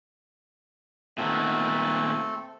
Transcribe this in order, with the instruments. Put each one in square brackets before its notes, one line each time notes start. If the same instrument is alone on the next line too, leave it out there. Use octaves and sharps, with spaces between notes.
[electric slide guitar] A#2 D#3 B3 [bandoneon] A3 C4 A4